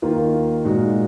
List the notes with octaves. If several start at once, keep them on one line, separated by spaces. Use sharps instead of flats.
D#2 D#3 A#3 F4
A#2 G#3 D#4 F#4